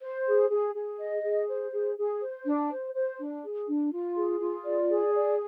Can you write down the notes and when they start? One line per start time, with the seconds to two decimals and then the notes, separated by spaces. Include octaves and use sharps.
0.02 C5
0.26 G#4
0.50 G#4
0.75 G#4
0.99 D#5
1.24 G#4
1.48 C5
1.72 G#4
1.97 G#4
2.21 C5
2.45 D4
2.70 C5
2.94 C5
3.19 D4
3.43 G#4
3.67 D4
3.92 F4
4.16 G#4
4.40 F4
4.64 D5
4.89 G#4
5.14 D5